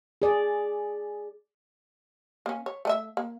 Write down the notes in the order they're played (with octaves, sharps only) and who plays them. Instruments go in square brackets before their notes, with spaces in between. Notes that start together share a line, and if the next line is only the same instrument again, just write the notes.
[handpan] G#4 D5
[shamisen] A#3 C#4
C#5
A3 D#5 E5
A#3